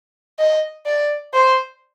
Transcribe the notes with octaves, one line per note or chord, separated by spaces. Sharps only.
D#5
D5
C5